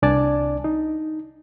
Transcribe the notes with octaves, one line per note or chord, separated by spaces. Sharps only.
C2 D4 D5 G#5 A5
D#4